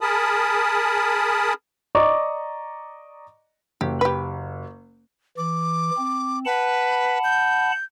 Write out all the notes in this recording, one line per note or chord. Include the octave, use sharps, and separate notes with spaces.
G#4 A#4 A5 B5 D#6
D5 D#5 A#5 C#6 D6
F#1 G4
G4 B4
E3 D6
C4
B4 F#5 A5 B5
G6